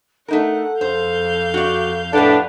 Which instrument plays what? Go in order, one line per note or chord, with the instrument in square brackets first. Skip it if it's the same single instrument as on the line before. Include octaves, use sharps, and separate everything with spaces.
[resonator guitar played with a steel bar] A3 D#4 A#4 [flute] A4 [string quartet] F#5
[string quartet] F2 F5 G6 [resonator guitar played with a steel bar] C5
[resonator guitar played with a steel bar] F#4 D5
[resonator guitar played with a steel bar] A2 G4 A4 [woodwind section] D4 B4 D5 [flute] F#5